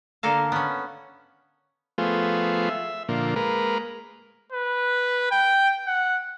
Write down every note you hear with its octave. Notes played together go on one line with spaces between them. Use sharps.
D3 A#3 A4 A#4 F5
B3 C#4
F3 A3 B3 F4 G#4 C5
E5
A#2 D3 F3 A#3
G#3 A#3 A#4 B4
B4
G5
F#5